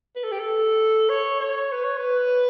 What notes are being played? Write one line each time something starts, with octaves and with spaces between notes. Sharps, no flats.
B4
A4
G4
A4
C#5
C#5
B4
C#5
B4